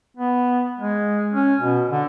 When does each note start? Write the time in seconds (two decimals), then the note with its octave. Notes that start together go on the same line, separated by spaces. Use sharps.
0.17 B3
0.79 G#3
1.34 C#4
1.61 B2
1.90 D3